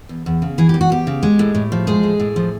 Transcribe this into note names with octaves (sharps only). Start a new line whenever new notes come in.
E2
E2
C#3
E3 G#4
E2 G4
F#4
E2 G4
C#3
G#3
A2
A2
F3
G#3 G#4
A2
A2
F3